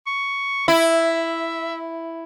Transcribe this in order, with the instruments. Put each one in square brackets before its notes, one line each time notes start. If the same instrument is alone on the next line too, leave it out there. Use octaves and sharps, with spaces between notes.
[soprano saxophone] C#6
[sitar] E4 [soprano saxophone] E5